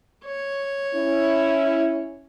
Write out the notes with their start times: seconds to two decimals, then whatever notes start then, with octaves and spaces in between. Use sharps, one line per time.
0.25 C#5
0.94 C#4 E4